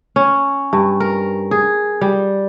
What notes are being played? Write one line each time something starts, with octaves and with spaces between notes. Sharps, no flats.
C#4
G2
A#4
G#4
G3